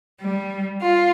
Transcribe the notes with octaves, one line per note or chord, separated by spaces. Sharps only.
G3
F4